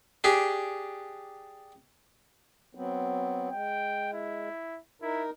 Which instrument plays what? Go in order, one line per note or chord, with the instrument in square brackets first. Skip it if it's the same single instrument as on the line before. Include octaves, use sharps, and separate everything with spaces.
[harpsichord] D4 G4 G#4
[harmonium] F#3 B3 C4
[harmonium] G#3 [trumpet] G5
[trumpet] E4
[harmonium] D#4 A#4 [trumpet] E4